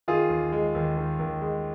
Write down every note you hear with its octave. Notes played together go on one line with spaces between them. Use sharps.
D#3 F4 G#4
D#2
G#3
D#2
D#3
D#2
G#3